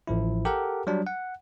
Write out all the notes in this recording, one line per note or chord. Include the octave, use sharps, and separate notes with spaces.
A1 F3 E4
G4 A4 A#4 F#5
F#3 G3 D4
F#5